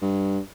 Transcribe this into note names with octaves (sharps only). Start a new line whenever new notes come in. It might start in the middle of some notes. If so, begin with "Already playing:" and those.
G2